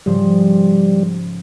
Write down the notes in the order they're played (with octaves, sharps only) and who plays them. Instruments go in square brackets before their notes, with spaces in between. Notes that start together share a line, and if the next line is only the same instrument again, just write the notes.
[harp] G#2 C#3 F3 [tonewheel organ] G3